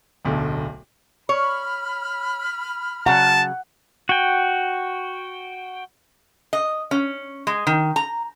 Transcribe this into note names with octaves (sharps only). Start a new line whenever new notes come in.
D1 B1 D3
C#5 B5 F6
C#3 F#3 F#5 A5
F#4 G5
D#5
C#4
G#3
D#3
A#5